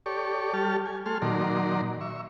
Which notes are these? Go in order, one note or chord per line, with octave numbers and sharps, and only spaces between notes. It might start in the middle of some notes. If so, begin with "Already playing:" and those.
G4 A4 C#5 D5 C#6
G3 G4 A4 A5 F6
G#5
A3 G#4 A4 C6 F6
A#2 D#3 F#3 D5 A#5 C6
E5 C#6